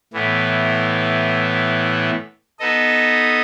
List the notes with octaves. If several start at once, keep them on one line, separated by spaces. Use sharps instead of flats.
A2 E3 B3
B3 D#4 A4 D#5